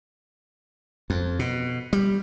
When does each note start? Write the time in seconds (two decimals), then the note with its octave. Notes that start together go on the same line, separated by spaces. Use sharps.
1.10 F2
1.39 B2
1.93 G3